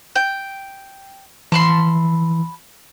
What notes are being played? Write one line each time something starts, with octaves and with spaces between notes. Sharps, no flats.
G5
E3 A5 B5 C6